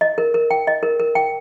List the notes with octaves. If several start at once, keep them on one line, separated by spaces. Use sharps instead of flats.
D#5
A#4
A#4
G5
D#5
A#4
A#4
G5